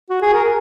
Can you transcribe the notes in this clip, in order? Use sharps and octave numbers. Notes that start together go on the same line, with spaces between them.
F#4
G#4
A#4